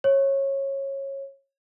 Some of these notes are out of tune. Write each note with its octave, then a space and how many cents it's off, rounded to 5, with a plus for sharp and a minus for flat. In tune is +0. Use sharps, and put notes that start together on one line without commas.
C#5 -20